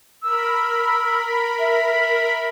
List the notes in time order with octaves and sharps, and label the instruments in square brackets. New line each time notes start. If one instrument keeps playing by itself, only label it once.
[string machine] A#4 B5 [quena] E6
[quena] E5